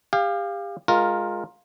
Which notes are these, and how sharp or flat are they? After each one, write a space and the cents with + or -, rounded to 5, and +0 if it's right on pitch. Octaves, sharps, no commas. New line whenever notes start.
G4 +35 F5 -5
G#3 +0 F4 +15 A#4 +0